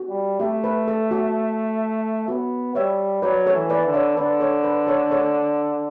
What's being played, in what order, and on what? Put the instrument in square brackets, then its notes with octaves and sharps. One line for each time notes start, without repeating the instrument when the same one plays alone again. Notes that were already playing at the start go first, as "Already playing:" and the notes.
Already playing: [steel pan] F#4
[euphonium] G3
[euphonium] A3 [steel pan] G4
[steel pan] B4
A4
F#4
[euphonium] B3 [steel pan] F#4
[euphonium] G3 [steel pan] C#5 E5
[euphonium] F#3 [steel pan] B4 D5
[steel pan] A4 C#5
[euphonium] E3
[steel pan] B4 D5
[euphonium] D3
[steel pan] C#5 E5
[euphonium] D3 [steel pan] B4 D5
[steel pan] A4 C#5
B4
A4 C#5
A4 C#5